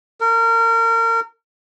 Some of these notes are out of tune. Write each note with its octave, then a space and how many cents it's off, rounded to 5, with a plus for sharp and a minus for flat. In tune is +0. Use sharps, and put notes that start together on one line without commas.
A#4 -30